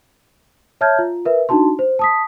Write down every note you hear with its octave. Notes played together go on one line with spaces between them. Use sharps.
C#5 E5 A5 F6 G6 G#6
F4
A#4 B4 E5
D4 D#4 F#4 A5 C6
C5
A5 D#6 B6